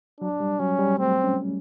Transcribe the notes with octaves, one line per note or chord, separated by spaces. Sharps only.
F#3 D4
G3
F#3 C#4
G3
A3 C4
C#4